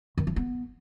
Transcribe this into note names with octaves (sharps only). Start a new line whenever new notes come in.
D#3
E3
B3